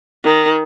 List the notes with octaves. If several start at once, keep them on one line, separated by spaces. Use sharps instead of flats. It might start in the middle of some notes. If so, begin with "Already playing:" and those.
D#3